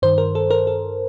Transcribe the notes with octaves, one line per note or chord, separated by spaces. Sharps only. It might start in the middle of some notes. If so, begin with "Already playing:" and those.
G2 D#3 C5
A#4
A4
A#4
A4